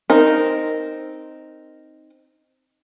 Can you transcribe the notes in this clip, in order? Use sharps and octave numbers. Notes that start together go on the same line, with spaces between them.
C4 D#4 A#4